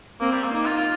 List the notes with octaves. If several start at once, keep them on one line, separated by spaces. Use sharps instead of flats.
A#3 C4
G3
A#3
A#3 D#4
F4
F4